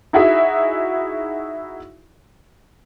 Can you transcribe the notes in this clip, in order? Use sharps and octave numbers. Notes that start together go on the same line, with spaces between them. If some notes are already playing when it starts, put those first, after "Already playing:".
D#4 E4 F#4 G#4 E5